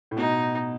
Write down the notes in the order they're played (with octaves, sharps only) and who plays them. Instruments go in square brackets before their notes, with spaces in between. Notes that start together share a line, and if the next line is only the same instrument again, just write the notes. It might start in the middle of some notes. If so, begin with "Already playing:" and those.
[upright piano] A2
[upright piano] B2 [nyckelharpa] D#4